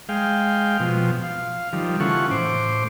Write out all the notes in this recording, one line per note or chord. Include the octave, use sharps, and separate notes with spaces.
G#3 F5 G5
B2 F3
F5
D#3 F3 G3
C#3 E3 A3 F4 F#5 C#6
A2 C5 D6